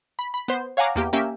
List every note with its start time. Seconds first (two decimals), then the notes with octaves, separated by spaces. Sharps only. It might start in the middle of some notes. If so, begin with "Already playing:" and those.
0.19 B5
0.34 B5
0.48 B3 C5
0.77 C#5 F5 F#5 G#5 A#5 D6
0.95 E2 A#3 G4
1.13 A#3 C#4 G4 E5